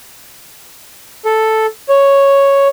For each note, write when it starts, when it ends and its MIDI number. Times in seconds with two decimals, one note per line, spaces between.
1.25 1.66 69
1.89 2.68 73